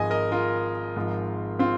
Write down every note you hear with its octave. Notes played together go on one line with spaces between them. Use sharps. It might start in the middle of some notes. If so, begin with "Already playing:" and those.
Already playing: G#1 G#2 F3 G#3 D#5 G#5
A#4 D#5
F4 A#4
G#1 G#2 F3 G#3
C4 F4